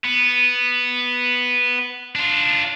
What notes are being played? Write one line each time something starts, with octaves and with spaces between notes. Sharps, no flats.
B3
D4 F4